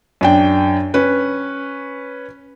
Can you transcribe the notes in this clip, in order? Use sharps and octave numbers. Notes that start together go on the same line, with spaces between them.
F#2 D4 G5
C#4 B4